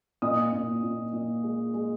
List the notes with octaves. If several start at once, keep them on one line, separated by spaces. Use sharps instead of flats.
A#2 D#5 D#6
A#2
A#2
A#2
G#3
G#3